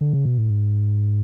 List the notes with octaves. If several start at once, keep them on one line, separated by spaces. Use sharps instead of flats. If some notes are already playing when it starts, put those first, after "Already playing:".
D3
C#3
B2
A2
G#2